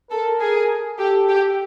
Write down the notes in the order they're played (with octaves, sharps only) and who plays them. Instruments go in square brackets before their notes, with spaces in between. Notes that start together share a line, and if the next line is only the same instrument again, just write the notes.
[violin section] A4 [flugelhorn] A#4
[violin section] G#4
[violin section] G4 [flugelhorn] A4
[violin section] G4